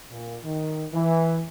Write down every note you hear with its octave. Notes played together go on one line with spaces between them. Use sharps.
A#2
D#3
E3